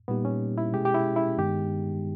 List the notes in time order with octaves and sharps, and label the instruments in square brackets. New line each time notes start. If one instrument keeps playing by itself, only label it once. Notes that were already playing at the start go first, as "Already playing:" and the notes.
[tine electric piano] A#2 G3 A#3 D#4 G4 [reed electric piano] B3
[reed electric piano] C#4
E4
[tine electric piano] B2 G#3 C#4 G#4 [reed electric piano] G4
[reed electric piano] G4
E4
E4
[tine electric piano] G2 D#3 G#3 B3 D#4 [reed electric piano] G4